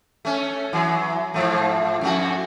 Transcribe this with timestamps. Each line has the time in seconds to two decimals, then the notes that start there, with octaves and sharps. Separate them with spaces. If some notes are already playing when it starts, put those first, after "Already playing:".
0.25 A3 C#4
0.73 E3 F#3
1.34 G#2 F3 A3
2.01 F2 A3 F#4